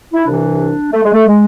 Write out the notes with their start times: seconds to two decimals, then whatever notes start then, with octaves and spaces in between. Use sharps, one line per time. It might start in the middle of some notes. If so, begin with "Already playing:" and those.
0.14 E4
0.25 C2 C3 E3 D4
0.93 A3
1.03 G#3
1.13 A3
1.27 G#3